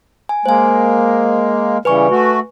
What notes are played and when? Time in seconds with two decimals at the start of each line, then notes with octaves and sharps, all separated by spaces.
0.29 G#5
0.46 G#3 A#3 C5 G#5
1.85 C#3 E3 G3 B4 G#5 C#6
2.10 A3 F#4